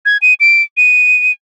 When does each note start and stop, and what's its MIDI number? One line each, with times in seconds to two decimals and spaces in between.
0.06 0.17 92
0.22 0.34 99
0.40 0.62 98
0.77 1.32 99